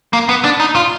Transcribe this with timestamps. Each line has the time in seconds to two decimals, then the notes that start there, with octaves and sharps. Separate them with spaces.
0.13 A#3
0.29 B3
0.44 D4
0.60 D#4
0.75 F4